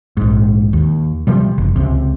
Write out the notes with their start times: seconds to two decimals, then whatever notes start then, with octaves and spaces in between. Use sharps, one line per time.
0.17 A#1 G#2
0.73 D#2
1.27 C3 F3 G3
1.58 F#1
1.76 C#2 C3